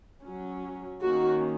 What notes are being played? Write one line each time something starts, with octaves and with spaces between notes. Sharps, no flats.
F#3 C#4
D#3 A#3 C#4 F#4